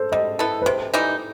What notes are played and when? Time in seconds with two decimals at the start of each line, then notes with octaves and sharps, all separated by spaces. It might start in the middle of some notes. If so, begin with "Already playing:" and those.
Already playing: A4 C5
0.12 G3 D#5
0.39 B3 E4 A4
0.62 B4
0.66 C3 C5
0.94 E3 G3 D#4